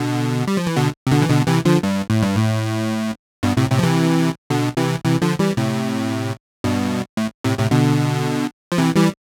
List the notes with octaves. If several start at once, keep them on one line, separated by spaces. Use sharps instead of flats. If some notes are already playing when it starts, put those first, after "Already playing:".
Already playing: B2 D3
G3
F3
E3
B2 D3
C3
B2 D3
E3
B2 D3
C3 E3
D3 F3
G2
A2
G2
A2
G2 B2
A2 C3
A2 C3
F3
C3 E3
B2 D3
C3 E3
C3 E3
D3 F3
E3 G3
A2 C3
G2 B2
A2
A2 C3
A2 C3
B2 D3
F3
C3 E3
E3 G3